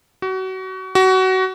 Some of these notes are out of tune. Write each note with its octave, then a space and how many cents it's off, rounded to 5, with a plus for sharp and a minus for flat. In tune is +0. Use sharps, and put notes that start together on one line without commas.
F#4 +30
F#4 +25